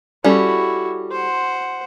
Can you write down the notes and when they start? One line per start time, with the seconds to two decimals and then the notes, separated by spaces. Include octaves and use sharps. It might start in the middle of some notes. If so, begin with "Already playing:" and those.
0.24 G3 C#4 E4 F#4 A4
1.11 C5 F#5